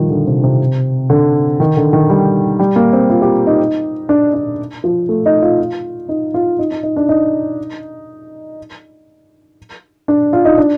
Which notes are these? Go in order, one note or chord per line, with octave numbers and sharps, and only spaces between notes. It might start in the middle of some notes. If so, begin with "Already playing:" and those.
Already playing: D#3 F3 G3
D3
C3
C3
D3
D#3
D3
D#3
G3
G3
A#3
C4
F4
G4
D#4
D4
D4
F3
A3
D#4
F4
F4
D#4
F4
D#4
D#4
D#4
D4
D#4
D4
F4
D#4
D4